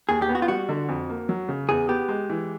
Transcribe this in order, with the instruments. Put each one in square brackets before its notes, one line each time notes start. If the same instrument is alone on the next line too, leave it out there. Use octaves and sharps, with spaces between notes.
[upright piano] D#2 [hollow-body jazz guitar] G#4
[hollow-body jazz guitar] G4
[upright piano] B3
[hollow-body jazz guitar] F#4
F4
[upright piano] G3 [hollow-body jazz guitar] F#4
[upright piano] D3
F2
A#3
F#3
C#3
[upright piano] E2 [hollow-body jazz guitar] G#4
[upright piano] B3 [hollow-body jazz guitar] G4
[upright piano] G#3
E3